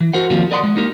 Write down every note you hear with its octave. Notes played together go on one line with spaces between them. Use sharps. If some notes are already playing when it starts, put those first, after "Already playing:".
E3
F#4 A#4 C5 F#5
D#3 F3 G3 A#3 C4 F4
A#4 D5 D#5 F#5 B5 C6
G#3
A#3 D#4 G4 A#4